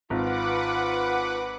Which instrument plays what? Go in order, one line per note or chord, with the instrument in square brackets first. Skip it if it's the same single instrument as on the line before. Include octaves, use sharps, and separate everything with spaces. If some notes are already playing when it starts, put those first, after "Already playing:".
[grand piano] G#1 [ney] F4 [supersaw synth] B4 F#5 D6